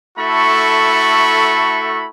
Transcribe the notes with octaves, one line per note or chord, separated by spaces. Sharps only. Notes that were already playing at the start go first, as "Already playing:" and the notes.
A3 E4 F#4 A4 B5 C#6